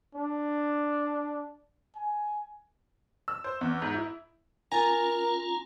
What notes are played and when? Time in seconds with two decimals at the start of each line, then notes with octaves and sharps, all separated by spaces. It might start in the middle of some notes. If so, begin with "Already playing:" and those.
0.15 D4
1.96 G#5
3.28 E6
3.44 C5
3.61 E2
3.82 G#2
3.94 E4
4.72 C#4 F4 A#4 G#5 A#5 A6